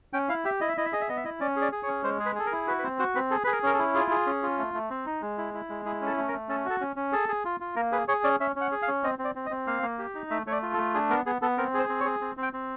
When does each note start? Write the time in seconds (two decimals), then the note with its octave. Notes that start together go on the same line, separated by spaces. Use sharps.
0.13 C#4 G5
0.29 E4 F5
0.45 G4 E5
0.61 E4 D#5
0.69 E5
0.77 E4 D#5
0.85 E5
0.93 G#4 D#5
1.01 E5
1.09 B3 D#5
1.17 E5
1.25 E4 D#5
1.40 C#4 D5
1.56 G#4
1.62 D5
1.72 G#4
1.83 C#5
1.88 C#4
2.03 G#3 C5
2.20 G#4
2.26 B4
2.35 G#4 A4
2.46 A#4
2.52 E4
2.67 F#4 B4
2.79 B4
2.83 C4 C5
2.99 F#4 C5
3.15 C4 B4
3.31 G#4 A4
3.44 G#4 B4
3.52 A#4
3.63 C#4 A#4
3.74 A4
3.79 E4
3.95 F4 G#4
4.11 G#4
4.26 C#4
4.43 F4
4.58 A3
4.74 A3
4.90 C4
5.06 D#4
5.22 G#3
5.38 E4
5.54 E4
5.70 G#3
5.85 E4 G#4
6.01 C#4 A4
6.17 A3
6.28 A#4
6.33 A3
6.49 C#4 A4
6.65 F#4 A4
6.81 C#4
6.96 C#4
7.12 G#4 A4
7.29 G#4
7.45 F4
7.60 F4
7.76 A#3 A#4
7.92 G#4 B4
8.08 G#4 C#5
8.24 C#4 D5
8.40 C#4 E5
8.56 C#4 F#5
8.72 G#4
8.82 F5
8.88 C#4
9.03 C4 D#5
9.19 C4
9.24 D5
9.35 C4
9.46 D#5
9.51 C4
9.67 A#3 F5
9.83 A#3
9.99 G4
10.15 D#4
10.30 A3 E5
10.47 A3 C#5
10.52 D5
10.62 F4
10.73 A4
10.78 A3
10.94 D4 G#4
11.10 B3 A#4
11.26 B3 G#4
11.42 B3 A4
11.58 C4 A#4
11.74 G#4 C5
11.89 C4
12.00 C#5
12.05 G#4
12.21 C4
12.37 C4
12.42 G5
12.53 C4